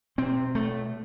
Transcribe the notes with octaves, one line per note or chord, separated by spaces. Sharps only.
B2 C4
A3